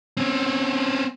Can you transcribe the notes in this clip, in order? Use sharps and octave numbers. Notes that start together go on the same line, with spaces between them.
C4 C#4